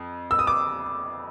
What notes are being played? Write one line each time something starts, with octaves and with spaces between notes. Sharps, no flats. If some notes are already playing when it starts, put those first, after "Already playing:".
Already playing: F2
E6
D#6
D6